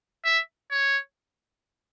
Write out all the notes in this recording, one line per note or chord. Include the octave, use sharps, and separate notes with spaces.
E5
C#5